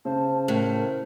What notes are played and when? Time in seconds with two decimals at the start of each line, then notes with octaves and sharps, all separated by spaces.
0.05 C#3 C5 A5
0.48 A2 A#4